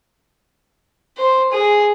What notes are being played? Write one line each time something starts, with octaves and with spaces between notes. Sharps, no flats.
C5
G#4